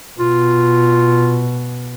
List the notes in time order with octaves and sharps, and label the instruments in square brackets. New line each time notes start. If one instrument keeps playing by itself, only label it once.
[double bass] B2 [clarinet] F4